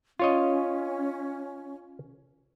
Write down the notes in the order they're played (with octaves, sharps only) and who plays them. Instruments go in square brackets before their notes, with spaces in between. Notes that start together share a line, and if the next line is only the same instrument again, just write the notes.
[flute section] C#4 [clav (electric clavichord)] F4 C#5 D#5